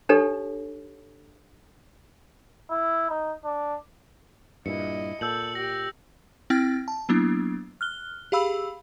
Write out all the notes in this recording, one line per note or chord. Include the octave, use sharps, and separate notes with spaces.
D4 D#4 G4 A4 C#5
E4
D#4
D4
G2 A#2 E4 D#5 C#7
A#2 A4 E6 G6 F#7
G4 A#6
C4 E4 G5 F6 A6
A5
F#3 A#3 B3 D4 E4
F6 F#6 G7
G4 G#4 F5 B5 E6